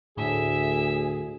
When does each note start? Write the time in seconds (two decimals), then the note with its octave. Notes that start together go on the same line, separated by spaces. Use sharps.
0.17 D2 A2 G#4 E5